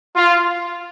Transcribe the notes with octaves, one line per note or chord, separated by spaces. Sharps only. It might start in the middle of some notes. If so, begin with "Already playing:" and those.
F4